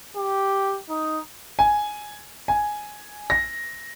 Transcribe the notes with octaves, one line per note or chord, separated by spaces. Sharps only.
G4
D#4
G#5
G#5
A#6